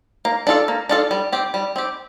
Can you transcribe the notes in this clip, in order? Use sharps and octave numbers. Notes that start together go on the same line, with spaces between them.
A#3
D4 F4 A4
A#3
D4 F4 A4
G3
C4 G4
G3
C4 G4